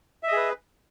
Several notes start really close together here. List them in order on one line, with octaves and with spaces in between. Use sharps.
E5 D#5 G#4 B4